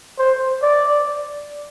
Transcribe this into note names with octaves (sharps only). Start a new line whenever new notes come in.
C5
D5